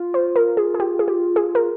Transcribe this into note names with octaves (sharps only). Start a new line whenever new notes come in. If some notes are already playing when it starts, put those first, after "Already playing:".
Already playing: F4
C5
A#4
G#4
G#4
G4
G#4
G4
G#4
A#4